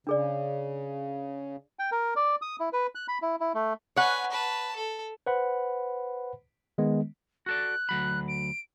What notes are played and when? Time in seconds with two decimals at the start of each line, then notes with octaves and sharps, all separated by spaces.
0.07 C#3 D4 G#4 D5
1.79 G5
1.92 A#4
2.16 D5
2.42 D#6
2.60 E4
2.73 B4
2.95 F#6
3.08 B5
3.22 E4
3.40 E4
3.55 A3
3.96 B4 C#5 F#5 G#5
4.31 B4 A5
4.76 A4
5.26 B4 C5 F#5 B5
6.78 D#3 G#3 B3
7.46 F#4 A4 D5 F#6
7.89 D2 F#3 B5
8.28 D7